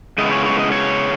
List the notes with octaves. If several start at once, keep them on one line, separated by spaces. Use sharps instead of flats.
C#3 G#3 B3 E4 D#5
C#5
C#5
D#5
C#5